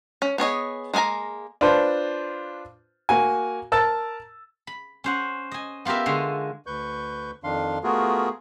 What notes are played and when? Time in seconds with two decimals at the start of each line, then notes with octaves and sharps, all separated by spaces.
0.22 C#4
0.38 B3 G#4 C#5 D#5
0.94 G#3 A#3 B3 G#5 A#5
1.61 D4 F4 B4 C5 A5
3.09 A#3 F#4 G#5
3.72 A#4 A5 E6 A6
4.67 B5
5.04 C#4 C5 F#5
5.52 D#5 G#5
5.85 B3 F4 G4 A#4 E5
6.06 D3 G#3 C#5 C6
6.66 D2 B4 C#6 G6
7.44 F2 D#3 D4 F5 C6
7.84 A3 B3 F4 F#4 G#4 A#4